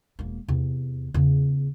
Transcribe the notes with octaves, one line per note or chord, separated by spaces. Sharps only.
E1 A#3
E2 C3
E2 C#3